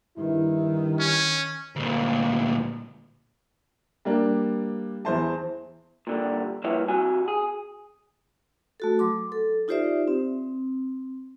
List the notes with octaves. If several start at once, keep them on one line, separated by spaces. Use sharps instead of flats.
G2 D#3 E4
C#4
D2 A#2
G3 A#3 D4
E2 E3 C5 A5
A#2 D3 G3
A#2 G3 E4 B4 C#5 E5
C3 F#4 G#5
G#4
A3 F#4 A4
F#3 C6 D6
A4
D#4 F4 G4 C5 D5 E5
C4